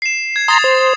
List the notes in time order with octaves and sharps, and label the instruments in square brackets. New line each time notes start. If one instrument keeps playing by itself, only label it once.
[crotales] C7 E7
G#6
[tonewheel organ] A#5 C6 [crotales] D#6 A6 F7
[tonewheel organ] C5